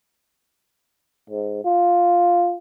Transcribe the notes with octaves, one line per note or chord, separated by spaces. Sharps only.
G#2
F4